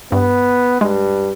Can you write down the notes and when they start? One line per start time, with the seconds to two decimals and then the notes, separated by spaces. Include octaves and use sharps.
0.12 G2 B3
0.81 G2 G#3